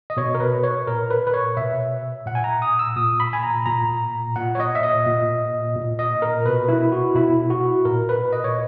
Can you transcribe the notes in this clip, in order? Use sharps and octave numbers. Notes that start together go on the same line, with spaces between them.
D#5
B2 C#5
A#4
B4
C#5
A#2 A#4
B4
B4
C#5
B2 E5
A#2 F#5
G#5
A#5
D#6
E6
A#2 D#6
B5
G#5
A#5
A#2 A#5
A#2 F#5
C#5
D#5
E5
D#5
A#2
A#2
D#5
A#4
B2 B4
E4
F#4
B2 E4
F#4
A#2 A#4
B4
D#5
C#5